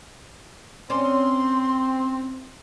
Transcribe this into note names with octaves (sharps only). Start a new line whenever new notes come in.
C4 C#4 C5 D5 C6